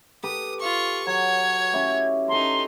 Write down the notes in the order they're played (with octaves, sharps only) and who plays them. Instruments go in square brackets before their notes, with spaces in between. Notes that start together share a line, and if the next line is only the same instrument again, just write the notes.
[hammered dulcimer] G4 A4 B4 [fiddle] D#6
[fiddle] F4 C#6
[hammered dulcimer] F#3 [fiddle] C#5 [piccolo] G#6
[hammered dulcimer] C#4 E4 G4
[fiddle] C#4 D#4 [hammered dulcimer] A4 A#5 [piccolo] C6